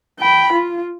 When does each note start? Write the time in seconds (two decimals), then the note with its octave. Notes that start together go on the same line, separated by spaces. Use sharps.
0.19 G5 B5
0.53 F4